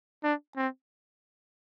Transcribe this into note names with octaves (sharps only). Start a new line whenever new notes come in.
D4
C4